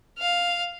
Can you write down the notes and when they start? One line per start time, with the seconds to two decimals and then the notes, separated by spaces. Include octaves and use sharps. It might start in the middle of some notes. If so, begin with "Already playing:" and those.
0.19 F5